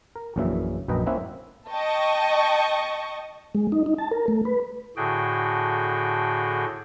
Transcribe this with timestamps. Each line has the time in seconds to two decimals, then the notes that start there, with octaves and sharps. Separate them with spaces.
0.16 A#4
0.36 A#1 F#2 A#2 C#3 E3 E5
0.88 A#1 F#2 B4 D#5 G5 A#5
1.06 A#3 C4 C#4 E4 E5 F#5
1.71 D#5 G5 A5 C#6
3.55 G#3
3.72 D#4
3.86 D#4
3.98 A5
4.11 A#4
4.28 A3
4.45 B4
4.96 A2 D3 F#4 G#4 G5